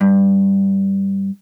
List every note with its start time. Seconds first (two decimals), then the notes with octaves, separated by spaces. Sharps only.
0.01 G2